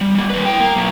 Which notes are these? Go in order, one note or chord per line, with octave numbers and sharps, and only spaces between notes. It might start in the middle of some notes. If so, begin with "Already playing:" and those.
G3
G3 A#3
D#2 B4
E4 G5
A#3
B2 F#3